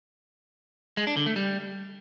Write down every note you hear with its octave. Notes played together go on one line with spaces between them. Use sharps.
G#3
D4
D3
A3
G3